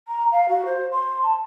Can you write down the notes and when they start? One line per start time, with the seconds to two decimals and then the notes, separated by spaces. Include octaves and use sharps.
0.08 A#5
0.32 F5
0.49 F#4
0.66 C5
0.92 C6
1.23 A5